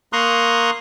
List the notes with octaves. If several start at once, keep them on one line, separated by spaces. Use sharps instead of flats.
A#3 A#5 C6 C#6 D#6 F#6